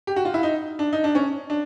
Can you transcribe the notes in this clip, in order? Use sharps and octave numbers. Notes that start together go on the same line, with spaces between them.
G4
F#4
F4
E4
D#4
D4
D#4
D4
C#4
D4